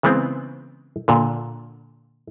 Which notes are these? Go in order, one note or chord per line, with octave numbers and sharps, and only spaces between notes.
C#3 E3 G#3 B3 C4
A#2 D3